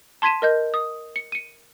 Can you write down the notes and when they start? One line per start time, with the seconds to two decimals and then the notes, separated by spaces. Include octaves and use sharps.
0.22 A5 C6 G#6 B6 D#7 E7
0.42 A#4 D#5 G6
0.74 D#6
1.16 C#7
1.32 C#7 D#7